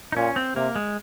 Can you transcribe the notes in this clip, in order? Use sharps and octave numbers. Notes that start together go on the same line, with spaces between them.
D#4
A#2 C#4
C4
C3 A#3
G#3